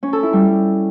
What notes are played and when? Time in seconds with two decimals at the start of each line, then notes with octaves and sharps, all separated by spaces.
0.03 C#4
0.13 A4
0.23 E4
0.33 G3